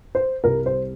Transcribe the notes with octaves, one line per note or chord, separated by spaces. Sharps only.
C5
C2 C3 G3 A#4
C5